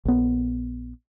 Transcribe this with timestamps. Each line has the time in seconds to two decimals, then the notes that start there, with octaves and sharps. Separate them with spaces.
0.05 A#1 B3